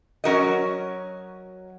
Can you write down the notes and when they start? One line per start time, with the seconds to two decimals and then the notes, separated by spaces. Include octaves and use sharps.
0.24 F#3 C#4 F#4 A#4 D#5